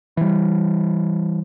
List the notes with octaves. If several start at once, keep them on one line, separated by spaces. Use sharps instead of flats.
E3 G3